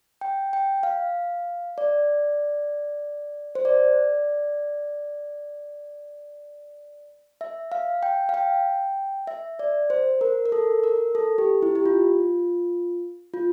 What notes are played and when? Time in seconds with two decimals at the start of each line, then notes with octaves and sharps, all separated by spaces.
0.21 G5
0.53 G5
0.83 F5
1.78 D5
3.55 C5
3.65 D5
7.41 E5
7.72 F5
8.03 G5
8.29 F5
8.34 G5
9.27 E5
9.59 D5
9.90 C5
10.21 A#4
10.46 A#4
10.52 A4
10.83 A#4
11.15 A4
11.38 G4
11.62 E4
11.75 G4
11.86 F4
13.34 F4